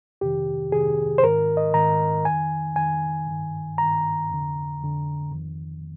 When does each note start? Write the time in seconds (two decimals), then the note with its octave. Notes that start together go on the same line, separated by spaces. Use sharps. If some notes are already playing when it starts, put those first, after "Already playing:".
0.21 F2 C3 D#3 G4
0.72 F2 C3 D#3 G#4
1.18 C5
1.23 G#2 D#3 A#4
1.57 D#5
1.74 G#2 D#3 A#5
2.25 F2 D#3 G#5
2.76 F2 D#3 G#5
3.27 G2 D#3
3.78 G2 D#3 A#5
4.29 F2
4.34 D3
4.80 F2 D3
5.32 F2 D#3